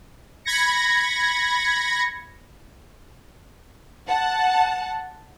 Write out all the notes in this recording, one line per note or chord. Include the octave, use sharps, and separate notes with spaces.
B5 G#6 A#6 C#7
F#5 A5